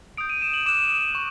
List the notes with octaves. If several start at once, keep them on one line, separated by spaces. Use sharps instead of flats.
D#6 G6 D7
D#7
E7
F#7
D6 F#6 E7
C#6